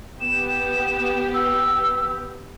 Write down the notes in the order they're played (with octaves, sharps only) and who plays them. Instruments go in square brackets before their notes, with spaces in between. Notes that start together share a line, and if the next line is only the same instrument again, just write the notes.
[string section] B3 G4 [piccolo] E7
[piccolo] E6